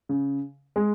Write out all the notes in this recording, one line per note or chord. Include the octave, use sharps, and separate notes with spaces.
C#3
G#3